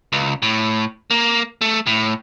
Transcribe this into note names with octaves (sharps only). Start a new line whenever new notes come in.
C#2
A2
A#3
A3
A2